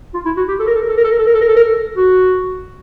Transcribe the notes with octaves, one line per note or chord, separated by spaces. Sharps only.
F4
E4
F#4
G4
A4
A#4
A4
A#4
A4
A#4
A4
A#4
A4
A#4
A4
A#4
A4
A#4
A4
F#4